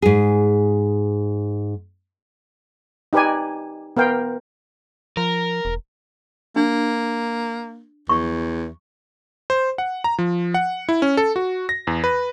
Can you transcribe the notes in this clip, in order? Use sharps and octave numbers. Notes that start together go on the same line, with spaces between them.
G#2 G#4
D#4 G4 B4 D5 G#5
B3 A#4 F5 G5
F3 A#4
E1
A#3 D4
E2 C#6
C5
F#5
A#5
F3
F#5
E4
C#4
A4
F#4
A#6
E2
B4